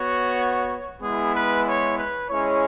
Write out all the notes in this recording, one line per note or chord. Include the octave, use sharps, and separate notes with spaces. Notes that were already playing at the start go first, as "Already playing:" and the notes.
Already playing: B3 F#4 C#5
G#3 B3 E4 G#4
B4
C#5
B4
G#3 C#4 E4 C#5